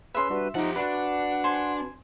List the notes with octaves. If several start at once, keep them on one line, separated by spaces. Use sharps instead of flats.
C#4 G#4 B4 E5 C6
G3 D4 F#4 B4
F3 D#4 G4 F#5
D4 F#4 B4 F#5
C5 G#5 C6